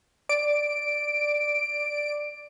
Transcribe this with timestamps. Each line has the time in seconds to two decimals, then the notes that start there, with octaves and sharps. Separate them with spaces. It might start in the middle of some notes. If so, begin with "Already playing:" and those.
0.29 D5 D7